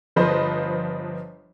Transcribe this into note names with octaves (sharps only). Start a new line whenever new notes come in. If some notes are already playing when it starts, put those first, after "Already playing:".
G1 F3 B4 C5 D#5